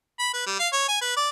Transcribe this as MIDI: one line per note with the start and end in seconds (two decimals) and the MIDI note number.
0.19 0.30 83
0.34 0.46 71
0.46 0.56 55
0.59 0.68 77
0.73 0.84 73
0.88 0.98 80
1.02 1.13 71
1.17 1.30 74